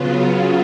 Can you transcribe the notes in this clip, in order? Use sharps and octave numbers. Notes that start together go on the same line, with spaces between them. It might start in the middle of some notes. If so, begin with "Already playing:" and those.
Already playing: C#3 F#3 B3 F4